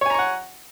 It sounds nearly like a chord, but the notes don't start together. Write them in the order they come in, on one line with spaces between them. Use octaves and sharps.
C#5 G#5 A#5 C#6 F#5